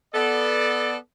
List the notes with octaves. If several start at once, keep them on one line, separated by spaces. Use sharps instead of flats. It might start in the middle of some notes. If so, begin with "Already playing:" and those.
B3 A4 D5